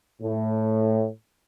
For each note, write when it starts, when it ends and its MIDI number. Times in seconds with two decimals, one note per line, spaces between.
0.21 1.08 45